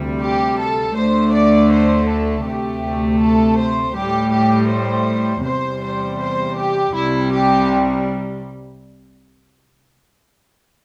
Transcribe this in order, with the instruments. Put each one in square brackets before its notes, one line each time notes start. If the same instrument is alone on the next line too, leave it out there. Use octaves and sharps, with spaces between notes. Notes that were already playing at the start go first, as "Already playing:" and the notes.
Already playing: [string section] D2 C3 G3
G4
A4
D2 D3 A3 C5
D5
C5
A4
D2 C3 A3 G4
A4
C5
A2 G3 G4
G4
C5
E2 C3 G3 C5
C5
C5
G4
C2 C3 G3 E4
G4